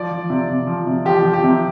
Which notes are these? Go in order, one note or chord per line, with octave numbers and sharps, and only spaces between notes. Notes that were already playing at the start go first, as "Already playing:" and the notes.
Already playing: F3 D5
F3
C3
C3
F3
C3
F3 G4
F3
G4
C3